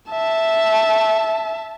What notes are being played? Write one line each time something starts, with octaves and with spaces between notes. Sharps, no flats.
E5 A5